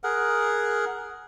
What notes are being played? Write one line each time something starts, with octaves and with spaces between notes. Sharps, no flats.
G#4 A#4 F#5